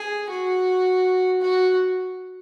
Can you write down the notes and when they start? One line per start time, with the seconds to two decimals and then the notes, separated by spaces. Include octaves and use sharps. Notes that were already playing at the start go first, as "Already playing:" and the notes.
Already playing: G#4
0.29 F#4
1.41 F#4